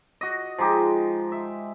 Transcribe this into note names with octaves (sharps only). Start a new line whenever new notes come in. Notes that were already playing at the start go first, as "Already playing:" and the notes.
F#4 D#5
F3 G#3 D#4 G4
E5